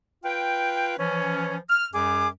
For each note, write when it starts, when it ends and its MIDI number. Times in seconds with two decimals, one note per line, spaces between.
0.24 0.95 65
0.24 0.95 71
0.24 0.95 79
0.99 1.57 52
0.99 1.57 53
0.99 1.57 61
1.70 1.87 89
1.94 2.28 42
1.94 2.28 55
1.94 2.28 68
1.94 2.28 86